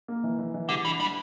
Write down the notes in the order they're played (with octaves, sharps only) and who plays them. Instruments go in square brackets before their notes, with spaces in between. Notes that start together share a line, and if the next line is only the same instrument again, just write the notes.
[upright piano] A#3
E3
E3
E3
[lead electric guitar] D3 [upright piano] G3
[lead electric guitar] E3 [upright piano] D4
[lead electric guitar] G3 [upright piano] D4